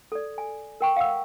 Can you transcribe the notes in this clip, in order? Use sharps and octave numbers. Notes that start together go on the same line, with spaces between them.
A4 D5
G#5
A#4 G5 C#6
F5 F#5 E6